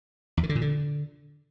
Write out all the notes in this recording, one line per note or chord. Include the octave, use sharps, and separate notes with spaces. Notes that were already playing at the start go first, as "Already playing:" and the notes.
E2
D#3
D3
A#2
D3